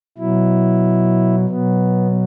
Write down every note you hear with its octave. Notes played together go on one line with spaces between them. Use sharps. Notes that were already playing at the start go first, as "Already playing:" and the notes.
B2 F#3 E4
B2 F#3 B3